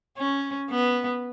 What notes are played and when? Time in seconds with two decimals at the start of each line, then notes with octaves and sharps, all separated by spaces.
0.17 C#4
0.70 B3